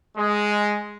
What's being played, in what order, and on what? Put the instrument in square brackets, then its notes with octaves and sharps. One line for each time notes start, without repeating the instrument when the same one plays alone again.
[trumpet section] G#3